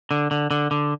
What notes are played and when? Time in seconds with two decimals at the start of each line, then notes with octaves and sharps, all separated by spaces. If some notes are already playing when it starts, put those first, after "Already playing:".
0.11 D3
0.31 D3
0.51 D3
0.71 D3